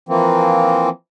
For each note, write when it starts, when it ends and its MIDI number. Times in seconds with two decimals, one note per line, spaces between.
0.09 0.89 52
0.09 0.89 53
0.09 0.89 58
0.09 0.89 60